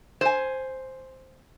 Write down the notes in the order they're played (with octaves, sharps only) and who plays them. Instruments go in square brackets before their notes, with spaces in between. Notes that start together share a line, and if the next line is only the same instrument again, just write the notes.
[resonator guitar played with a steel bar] C5 G#5